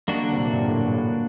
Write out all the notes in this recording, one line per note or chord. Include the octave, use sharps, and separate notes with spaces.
D#3 G3 A#3 D4 F#4
D3 F#3
C3
A#2 D3
C3
G2 A#2
A#2
A2
G2
A2